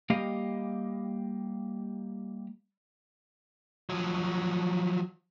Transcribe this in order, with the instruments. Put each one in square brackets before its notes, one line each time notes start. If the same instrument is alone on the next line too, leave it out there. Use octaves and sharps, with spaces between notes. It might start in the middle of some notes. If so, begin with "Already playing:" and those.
[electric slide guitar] G3 A#3 G4 D#5 F5
[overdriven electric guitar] F3 F#3